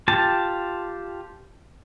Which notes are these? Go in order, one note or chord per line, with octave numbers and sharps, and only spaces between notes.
F4 G4 A5